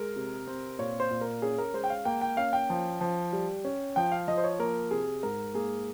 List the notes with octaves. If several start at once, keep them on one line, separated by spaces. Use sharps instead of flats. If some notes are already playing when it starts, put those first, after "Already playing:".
Already playing: G#3 A#4
C3
C4
A#2 C#5
C5
A#2
A#4
C#4 G#4
A#4
G#3 C5
G5
F5
A#3 G5
G5
C#4 F5
G5
F3
F3
G3
C#4
F3 G5
F5
F3 D#5
C5
C#5
A#3 A#4
C3 G#4
G#2 A#4
A#3 G#4